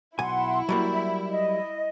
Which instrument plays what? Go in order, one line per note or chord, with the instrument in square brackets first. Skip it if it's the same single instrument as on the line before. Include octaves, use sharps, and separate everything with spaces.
[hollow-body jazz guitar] B1 G#5 [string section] E4 [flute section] F#5 C6
[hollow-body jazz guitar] F#3 G3 A#3 [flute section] B5
[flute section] D#5